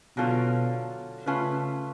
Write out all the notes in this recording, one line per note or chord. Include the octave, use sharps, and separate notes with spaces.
B2 D3 F#3 C#4 F4 A4
C#3 A3 C#4 F4 B4